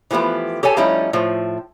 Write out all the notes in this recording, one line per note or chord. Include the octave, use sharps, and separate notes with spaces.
E3 F3 A3 B3 G4
G4 A4 C#5 G#5 A5
F3 G3 A3 C#4 D#4 E4
A2 F3